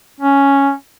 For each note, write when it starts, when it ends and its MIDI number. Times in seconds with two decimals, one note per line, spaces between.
0.20 0.73 61